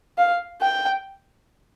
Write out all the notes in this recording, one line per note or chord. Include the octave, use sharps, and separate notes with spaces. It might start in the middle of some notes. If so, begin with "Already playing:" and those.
F5
G5